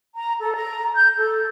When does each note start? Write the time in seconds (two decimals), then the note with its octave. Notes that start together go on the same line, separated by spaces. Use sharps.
0.15 A#5
0.41 A4
0.54 A#5
0.95 G6
1.17 A4